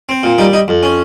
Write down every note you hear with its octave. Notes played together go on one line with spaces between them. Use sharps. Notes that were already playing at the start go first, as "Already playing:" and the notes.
C4
A#2
G3 D#4
D#4
F2
C#4